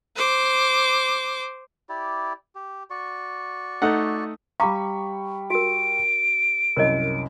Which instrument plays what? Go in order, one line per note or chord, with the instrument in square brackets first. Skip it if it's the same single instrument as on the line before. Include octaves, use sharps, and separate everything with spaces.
[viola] C5 D6
[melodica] E4 G4 D5
G4
F#4 D5 C#6
[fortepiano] A3 D#4 F#5
[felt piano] G3 B5 C#6 [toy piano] F5 A#5 D6
[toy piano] F#4 A#4 [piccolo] D7
[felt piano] C2 F#2 [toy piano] A#4 C#5 D#5